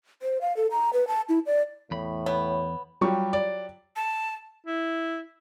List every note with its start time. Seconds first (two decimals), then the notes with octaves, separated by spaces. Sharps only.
0.22 C5
0.41 F5
0.57 A4
0.71 A#5
0.93 B4
1.08 A5
1.29 E4
1.46 D5
1.91 E2 A2 B5
2.26 B3 C#5
3.01 F#3 G3 F4 G4 C#6
3.33 D5
3.96 A5
4.67 E4